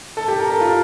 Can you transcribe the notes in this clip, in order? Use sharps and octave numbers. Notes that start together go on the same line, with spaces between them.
A4
G4
A#4
A4
F4